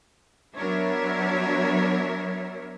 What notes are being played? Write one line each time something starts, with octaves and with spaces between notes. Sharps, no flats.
F#3 B3 D4 A#4 C#5 E5